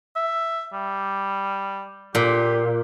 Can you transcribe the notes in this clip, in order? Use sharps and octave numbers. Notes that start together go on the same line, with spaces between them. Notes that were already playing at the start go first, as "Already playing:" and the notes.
E5
G3
A#2 G4